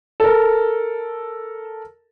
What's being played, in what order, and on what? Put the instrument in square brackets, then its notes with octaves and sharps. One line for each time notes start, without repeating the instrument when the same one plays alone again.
[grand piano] A4 A#4